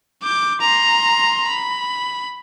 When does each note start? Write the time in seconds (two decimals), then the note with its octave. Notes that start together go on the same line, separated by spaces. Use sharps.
0.23 D6 G6
0.61 A#5 C6
1.48 B5